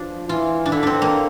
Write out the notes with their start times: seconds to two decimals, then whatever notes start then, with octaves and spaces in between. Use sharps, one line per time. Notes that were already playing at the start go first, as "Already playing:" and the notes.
Already playing: F3 D4
0.29 E3 F4
0.66 D4
0.72 D3 E4
0.83 C4 D4
1.02 A#3